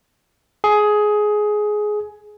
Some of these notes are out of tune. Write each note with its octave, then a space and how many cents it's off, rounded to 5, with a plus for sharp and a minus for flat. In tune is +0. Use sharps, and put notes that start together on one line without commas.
G#4 +15